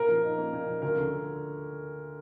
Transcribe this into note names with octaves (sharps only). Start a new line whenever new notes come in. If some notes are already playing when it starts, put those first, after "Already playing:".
Already playing: A#2 A#4
F3
D#4
A#3
A#2
F3
D2 A#4
D3